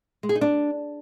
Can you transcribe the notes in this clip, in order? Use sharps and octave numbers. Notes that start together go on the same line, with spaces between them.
G#3
G#4
D#4
D4